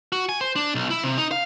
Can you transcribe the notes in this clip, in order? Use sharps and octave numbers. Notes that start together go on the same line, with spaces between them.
F#4
G#5
C5
D4
B1
E4
C3
D#4
F5